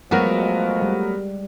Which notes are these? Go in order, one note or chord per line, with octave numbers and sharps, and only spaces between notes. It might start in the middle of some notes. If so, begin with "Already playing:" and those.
F3 F#3 G#3 A3 B3 F#4 A#4
G3